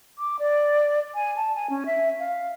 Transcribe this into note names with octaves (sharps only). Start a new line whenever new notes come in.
D6
D5
G#5
A5
G#5
C#4
E5
F5